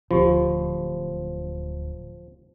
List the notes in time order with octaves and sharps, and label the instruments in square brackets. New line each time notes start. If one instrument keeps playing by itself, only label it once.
[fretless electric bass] D1 D2 [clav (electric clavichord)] F3 [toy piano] F4 G4